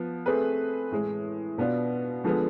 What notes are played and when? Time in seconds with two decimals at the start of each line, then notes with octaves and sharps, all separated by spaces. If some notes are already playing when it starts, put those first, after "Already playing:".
Already playing: F3 B3
0.26 A3 C4 G#4 B4
0.91 A2 E3 G#3
1.58 B2 B3 D4 F4
2.24 D3 F3 G#3 B3